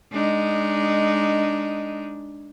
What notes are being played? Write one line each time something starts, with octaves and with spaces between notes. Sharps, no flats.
G#3 D4 D#4